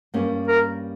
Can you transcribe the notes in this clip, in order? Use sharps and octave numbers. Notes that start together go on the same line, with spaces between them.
G2 G3 A#3 C#4
A#4